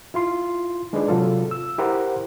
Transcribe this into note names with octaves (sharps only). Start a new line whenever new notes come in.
E4 F4 C6
G#3 D4 D#4 G#4 B4 D5
C3 F#3 F4 A4
E6
E4 G4 A#4 C5 F#5